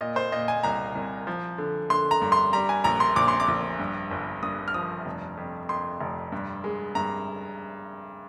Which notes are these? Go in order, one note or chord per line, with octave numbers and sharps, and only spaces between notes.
A#2 D#5
C5
A#2 D#5
G#5
C2 A#5
C2
F3
D3
D3 C6
A#5
G2
C6
G3 A#5
G#5
A#1 A#5
C6
A#1 D6
C6
D6
A#1
G2
G1
G2 D#6
F6
F3 D#6
F1
F2
F2 C6
F1
G2
G#3
G2 A#5